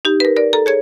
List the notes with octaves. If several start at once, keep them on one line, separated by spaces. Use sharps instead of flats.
D#4 G4
A#4 B4
A#4 D5
A4 A#5
G#4 C#5 G#6